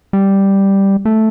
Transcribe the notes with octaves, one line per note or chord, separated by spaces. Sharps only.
G3
A3